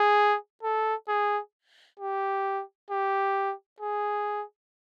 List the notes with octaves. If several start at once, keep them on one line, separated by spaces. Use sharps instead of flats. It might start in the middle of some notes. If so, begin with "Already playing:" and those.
Already playing: G#4
A4
G#4
G4
G4
G#4